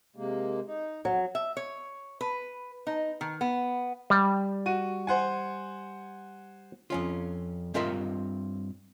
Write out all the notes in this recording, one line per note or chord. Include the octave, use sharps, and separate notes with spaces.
C3 G#3 A#3
D#4
F2 F#3
E5
C#5
B4
D#4
D#3
B3
G3
F#4 D#7
C5 F#5 G#5
F2 C#4 F4
G2 C4 F4 A#4 D#5 E5